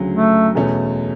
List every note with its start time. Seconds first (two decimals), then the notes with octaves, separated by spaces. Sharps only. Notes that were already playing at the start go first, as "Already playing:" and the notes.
Already playing: D2 C#3 F#3
0.13 A3
0.55 E2 B2 A3 C#4